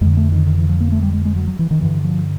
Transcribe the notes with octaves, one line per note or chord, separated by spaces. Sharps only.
F2 D3 G#3
A3
D#3
D#3
E3
F3
A#3
A3
G3
G#3
G#3
F#3
F#3
E3
D#3
G2 D3 E3
F3